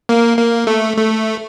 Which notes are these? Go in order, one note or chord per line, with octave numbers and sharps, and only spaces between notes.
A#3
A#3
A3
A3